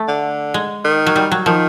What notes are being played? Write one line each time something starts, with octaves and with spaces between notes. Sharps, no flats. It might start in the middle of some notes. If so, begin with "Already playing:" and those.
Already playing: A3
D3
G#3
D#3
F#3
G3
F#3
D#3 F3